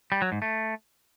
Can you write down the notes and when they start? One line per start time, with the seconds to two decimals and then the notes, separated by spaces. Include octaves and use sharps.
0.12 G3
0.22 F#3
0.32 G#2
0.42 A3